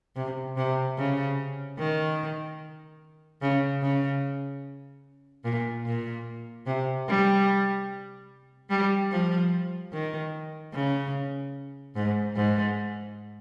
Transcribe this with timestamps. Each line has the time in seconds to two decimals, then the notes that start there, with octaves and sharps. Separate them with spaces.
0.16 C3
0.57 C3
0.98 C#3
1.78 D#3
3.42 C#3
3.82 C#3
5.45 A#2
5.86 A#2
6.67 C3
7.08 G3
8.70 G3
9.11 F3
9.92 D#3
10.73 C#3
11.96 G#2
12.36 G#2